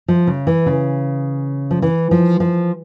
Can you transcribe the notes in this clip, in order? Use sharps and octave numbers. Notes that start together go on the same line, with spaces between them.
F3
C#3
E3
C#3
F3
E3
F3
F3